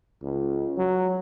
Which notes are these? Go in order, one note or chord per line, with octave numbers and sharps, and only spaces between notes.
C#2
F#3